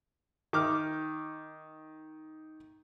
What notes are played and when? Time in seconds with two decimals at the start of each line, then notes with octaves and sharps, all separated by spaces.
0.53 D#3 D6 F6